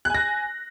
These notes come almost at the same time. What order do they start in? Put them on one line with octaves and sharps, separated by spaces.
F#6 G#5 A#6